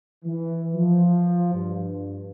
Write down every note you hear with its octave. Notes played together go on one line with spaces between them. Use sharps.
E3
F3
G2